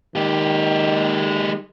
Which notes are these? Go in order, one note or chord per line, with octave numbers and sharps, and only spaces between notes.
D#3 G#3 G4